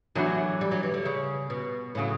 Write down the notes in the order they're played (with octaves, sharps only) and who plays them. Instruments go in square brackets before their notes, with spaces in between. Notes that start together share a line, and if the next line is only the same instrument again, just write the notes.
[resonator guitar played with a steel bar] A2 E3 B3 D4 F#4 [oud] F#3
[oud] G3
F#3
E3
D3
C#3
B2
[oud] A2 [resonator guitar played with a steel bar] C#3 F#3